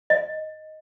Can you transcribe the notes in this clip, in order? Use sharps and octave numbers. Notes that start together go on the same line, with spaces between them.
D#5